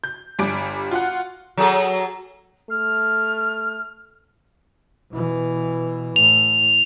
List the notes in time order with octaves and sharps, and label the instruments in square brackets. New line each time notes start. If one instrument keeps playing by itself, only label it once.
[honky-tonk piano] G6
G1 G3 G#5 D6 D7
F4 F#4 F#5
[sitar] F#3 G#4 A4
[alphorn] A3 [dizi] F6
[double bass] B2 E3
[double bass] A2 [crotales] F7